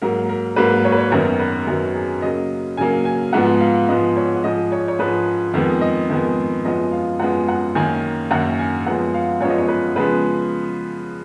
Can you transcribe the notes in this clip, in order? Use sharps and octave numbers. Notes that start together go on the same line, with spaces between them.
G#2 F#3 A#3 A#4
A#4
G#2 F#3 A#3 B4
C#5
B4
C#5
F#2 D#3 F#3 B3 A#4
B4
F#2 D#3 F#3 B3 A#4
G#4
C#3 F#3 A#3 D#5
C#3 F#3 A#3 G#5
G#5
G#2 F3 G#3 B3 F#5
F5
G#2 F3 G#3 B3 D#5
C#5
G#2 F3 G#3 D#5
C#5
C#5
G#2 F3 G#3 B4
F2 D#3 G#3 B3
D#5
F2 D#3 G#3 B3
F#2 F3 G#3 B3 D#5
F5
F#2 F3 G#3 B3 F#5
F#5
F#2 D#3 A#3 G#5
F#2 D#3 A#3 F#5
G#5
F#2 F3 G#3 B3 F#5
F5
F#2 F3 G#3 B3 C#5
D#5
C#5
B4
C#3 F3 G#3 B3 B4